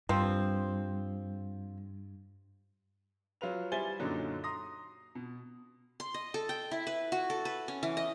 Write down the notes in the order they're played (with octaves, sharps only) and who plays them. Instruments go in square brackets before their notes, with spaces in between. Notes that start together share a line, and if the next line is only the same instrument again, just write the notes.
[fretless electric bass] G2 [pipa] F3 C4
[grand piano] F#3 F4 B4 F7
G3 E4 C5 G#5 A6 G7
F#2 A#2 D3 F#3 D#4
A#5 C6 D#6 A#6
B2
[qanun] C6
D#5
A4
G5
E4
B4
F#4
A4
B4
C#4
E3
D#5